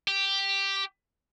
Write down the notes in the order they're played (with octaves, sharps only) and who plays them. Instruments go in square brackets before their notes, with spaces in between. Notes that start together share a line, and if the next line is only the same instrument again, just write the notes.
[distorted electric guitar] G4